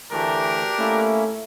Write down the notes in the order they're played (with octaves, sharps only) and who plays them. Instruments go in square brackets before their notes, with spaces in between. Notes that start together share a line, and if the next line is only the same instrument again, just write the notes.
[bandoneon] D2 E3 A3 [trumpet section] D4 G4 A#4
[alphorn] A3 [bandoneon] A#3 C#4 E4